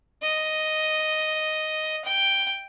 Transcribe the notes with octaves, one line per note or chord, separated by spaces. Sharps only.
D#5
G5